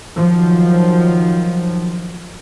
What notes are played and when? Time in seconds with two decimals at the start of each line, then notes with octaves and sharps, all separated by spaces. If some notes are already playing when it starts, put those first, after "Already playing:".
0.17 D#3 F3 F#3